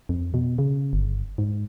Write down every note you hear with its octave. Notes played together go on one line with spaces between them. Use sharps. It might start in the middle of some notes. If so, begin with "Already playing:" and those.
F2
B2
C#3
G1
G#2